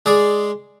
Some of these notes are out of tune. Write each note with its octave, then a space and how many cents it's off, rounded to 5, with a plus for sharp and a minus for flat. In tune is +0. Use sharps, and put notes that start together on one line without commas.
G#3 +0 G#4 +0 D5 +0